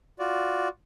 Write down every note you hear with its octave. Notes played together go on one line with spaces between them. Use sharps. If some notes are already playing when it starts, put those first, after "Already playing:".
F4 F#4 D5